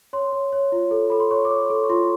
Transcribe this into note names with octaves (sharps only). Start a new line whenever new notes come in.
C#5 C6
C#5
C#5
F4
A4
A4 B5
C6
C#5 C#6
D6
C#5
C#6
A4
C6
C#6
F4 C6